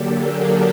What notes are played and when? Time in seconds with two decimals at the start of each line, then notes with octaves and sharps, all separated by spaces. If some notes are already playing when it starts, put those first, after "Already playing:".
Already playing: D3 F#3 A#3 D4 G4 A4
0.12 G#4 A#4